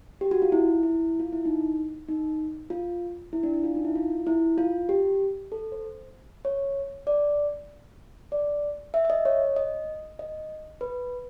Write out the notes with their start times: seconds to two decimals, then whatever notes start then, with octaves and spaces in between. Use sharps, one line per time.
0.21 G4
0.31 F#4
0.42 F4
0.52 E4
0.83 E4
1.20 F4
1.32 E4
1.45 D#4
2.08 D#4
2.70 F4
3.33 E4
3.43 D4
3.54 D4
3.64 F4
3.75 D#4
3.85 E4
3.95 F4
4.27 E4
4.58 F4
4.89 G4
5.52 A4
5.72 C5
6.45 C#5
7.07 D5
8.32 D5
8.94 E5
9.05 E5
9.10 D#5
9.25 C#5
9.56 D#5
10.19 D#5
10.81 B4